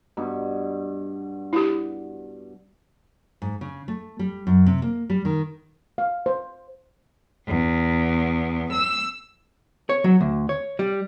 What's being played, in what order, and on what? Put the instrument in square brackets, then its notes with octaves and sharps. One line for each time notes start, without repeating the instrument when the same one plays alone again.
[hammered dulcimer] G2 B2
[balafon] E4 G4
[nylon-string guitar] G#2
C#3
A3
G3
F#2
C3
A#3
G3
D#3
[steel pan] F5
C5
[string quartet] E2
E6
[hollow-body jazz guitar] C#5
F#3
D2
C#5
G3